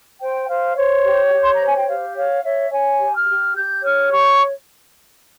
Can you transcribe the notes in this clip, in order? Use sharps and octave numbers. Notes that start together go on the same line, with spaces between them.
C5 G5
C5 F5
C5 C#5
G4
G4
C6
A#5
C5
G#5
G5
G4 F5
C#5 F5
C#5 E5
C#5 G#5
G4
F6
G4
G4 G6
C#5 F6
G4 C#6